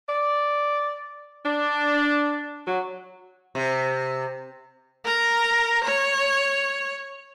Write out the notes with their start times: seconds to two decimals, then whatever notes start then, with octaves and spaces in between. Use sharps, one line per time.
0.09 D5
1.45 D4
2.67 F#3
3.55 C3
5.04 A#4 A#5
5.84 C#5